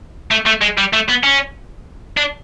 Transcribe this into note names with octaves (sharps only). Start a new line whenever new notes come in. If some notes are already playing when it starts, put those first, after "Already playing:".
A3
A3
G#3
G3
A3
B3
C#4
D4